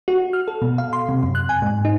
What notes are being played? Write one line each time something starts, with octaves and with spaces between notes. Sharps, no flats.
F#4
F6
A4
B2
F5
C6
C3
F#2
F#6
G#5
G#2
D#4